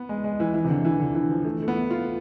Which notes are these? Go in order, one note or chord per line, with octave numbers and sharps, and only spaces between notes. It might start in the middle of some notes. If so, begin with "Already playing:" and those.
Already playing: B3
G#3
G#3
E3
E3
C3
D3
E3
D3
E3
F3
A3
A3
B3
F4